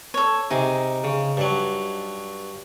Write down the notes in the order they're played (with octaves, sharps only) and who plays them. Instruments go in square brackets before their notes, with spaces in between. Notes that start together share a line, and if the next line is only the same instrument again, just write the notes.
[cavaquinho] A4 C#5
[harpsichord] C3 [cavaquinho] D#4 G#4
[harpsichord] C#3
G2 F#3